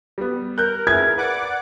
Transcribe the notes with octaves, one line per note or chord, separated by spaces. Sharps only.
G3 B3
A#4 F#6 G6
E4 G#4 B4 G#6
B4 D5 F#5 D6